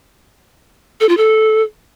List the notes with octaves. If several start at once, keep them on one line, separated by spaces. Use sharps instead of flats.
A4
F4
A4